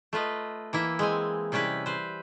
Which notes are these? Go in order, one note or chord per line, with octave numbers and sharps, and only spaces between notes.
A3 F4 B4 D#5
E3 A#3 E4
G#3 C4 G#5
C3 G3 C#4 E4 B4
B4 C5